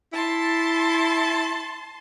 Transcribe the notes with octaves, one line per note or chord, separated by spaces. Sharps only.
E4 A5 C6